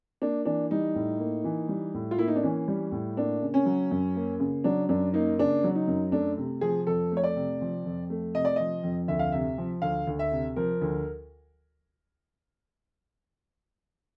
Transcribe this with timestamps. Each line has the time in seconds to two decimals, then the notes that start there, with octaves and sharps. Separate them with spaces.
0.22 A#3 D4
0.45 E3 D4
0.71 G3 D#4
0.95 A2
1.19 A#3
1.44 E3
1.69 G3
1.94 A2
2.11 F4
2.18 A#3 E4
2.28 D#4
2.36 D4
2.43 E3 C#4
2.68 G3
2.92 A2
3.17 A#3 D4
3.42 C#3
3.54 C#4
3.66 F#3
3.91 F#2
4.16 A#3
4.40 C#3
4.64 F#3 D4
4.89 F#2 D4
5.14 A#3 D#4
5.39 C#3 D4
5.64 F#3
5.75 D#4
5.88 F#2
6.12 A3 D4
6.38 C3
6.61 F3 G#4
6.87 F2 A4
7.12 A3
7.17 C#5
7.24 D5
7.36 C3
7.61 F3
7.85 F2
8.10 A3
8.34 C3 D#5
8.45 D5
8.56 F3 D#5
8.84 F2
9.08 D2 E5
9.19 F5
9.32 C3 E5
9.58 F3
9.82 D2 F5
10.07 D2
10.19 E5
10.32 C3
10.56 F3 A#4
10.81 D2